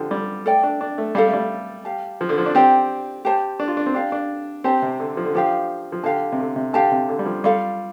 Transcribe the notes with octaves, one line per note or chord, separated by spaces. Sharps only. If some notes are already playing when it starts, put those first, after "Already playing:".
Already playing: D3 F3 G4 A5
G3
A3 A4 D5 G5
D4
D4
A3
G3 A4 F5 A5
A3
G3
G4 F5 A5
F3
D3
F3
D4
C4 G4 D5 G5
G4 C5 A5
D4
F4
D4
C4
D4 G4 F5 A5
D4
C4 G4 C5 A5
C3
D3
F3
D3
F3 D4 G4 F5
F3
D3 G4 F5 A5
C3
D3
C3
D3 G4 F5 A5
C3
D3
G3
F3
G3 F4 A4 F5